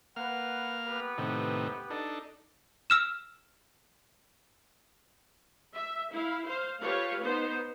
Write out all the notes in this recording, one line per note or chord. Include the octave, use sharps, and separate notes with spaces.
A#3 B4 F5 F#5 F6
B3 G4 B4
A2 C3 D#3
D4 D#4 A4
E6 F6 E7
E5
E4 F5
C5 F5
F4 G4 A4 B4 C#5 F5
B3 D#4 C5